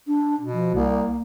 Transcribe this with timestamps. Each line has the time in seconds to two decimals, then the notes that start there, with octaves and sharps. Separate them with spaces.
0.07 D4
0.40 B2
0.53 F3
0.75 C2 A#3